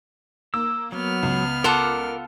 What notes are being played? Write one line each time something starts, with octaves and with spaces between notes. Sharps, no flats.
A#3 E6
F#3 B3 F6
C#2
F4 A4 A#4 F#5 D6